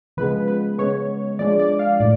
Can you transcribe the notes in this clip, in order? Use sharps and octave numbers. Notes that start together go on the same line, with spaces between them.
C#3 F3 G#3 B3 B4
B4
C#3 G#3 B3 C#5
F3 G#3 D4 D5
D5
F5
A2 D5